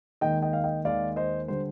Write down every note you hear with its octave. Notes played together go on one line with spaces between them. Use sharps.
D#2 D#3 G#3 D#5 G5
D#5 G5
F5
D#5 G5
D#2 D#3 G#3 D5 F5
C5 D#5
D3 G3 C5